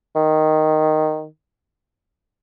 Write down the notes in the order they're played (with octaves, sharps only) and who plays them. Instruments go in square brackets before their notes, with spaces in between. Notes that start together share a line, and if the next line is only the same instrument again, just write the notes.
[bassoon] D#3